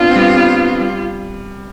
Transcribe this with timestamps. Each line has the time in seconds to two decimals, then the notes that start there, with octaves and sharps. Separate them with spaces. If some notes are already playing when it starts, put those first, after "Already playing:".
Already playing: B3 C4 D4 F4
0.11 C4
0.16 G3 B3
0.37 G3 B3
0.80 G3